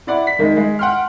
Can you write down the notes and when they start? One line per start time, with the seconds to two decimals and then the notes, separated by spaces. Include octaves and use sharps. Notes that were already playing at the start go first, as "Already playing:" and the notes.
0.07 E4 D5 F#5
0.27 B6
0.39 D#3 G#3 D#4
0.57 G#3
0.79 F#5 G5 C6 F6